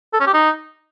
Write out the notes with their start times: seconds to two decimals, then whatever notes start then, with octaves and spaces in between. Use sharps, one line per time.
0.13 A4
0.20 C#4
0.27 G4
0.34 D#4